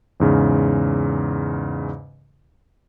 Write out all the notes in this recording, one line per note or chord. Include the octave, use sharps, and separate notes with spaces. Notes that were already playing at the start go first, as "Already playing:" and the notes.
E2 G#2 C#3